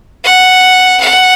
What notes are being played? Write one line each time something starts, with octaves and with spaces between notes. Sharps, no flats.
F#5
F#5